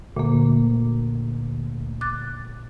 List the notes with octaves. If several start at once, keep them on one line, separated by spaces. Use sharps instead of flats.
D2 A#2 A#3
D6 F#6 A6